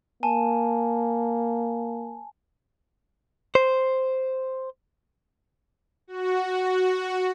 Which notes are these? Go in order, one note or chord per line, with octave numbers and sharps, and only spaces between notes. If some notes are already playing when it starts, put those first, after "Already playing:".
A#3 G#5 A5
C5
F#4